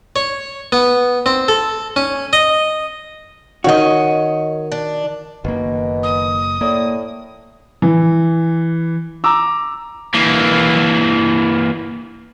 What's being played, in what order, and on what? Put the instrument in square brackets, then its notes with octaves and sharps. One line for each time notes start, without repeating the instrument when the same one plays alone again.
[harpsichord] C#5
B3
C4
A4
C#4
D#5
[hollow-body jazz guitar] D#3 F#4 [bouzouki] C#5 D#5
[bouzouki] D4
[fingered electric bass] F#1 A#3 [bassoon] B2 [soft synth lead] D#3
[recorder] D#6
[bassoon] A2 [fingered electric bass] A#3 [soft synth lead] D5
[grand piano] E3
A#5 D6 E6
[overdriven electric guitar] E3 A#3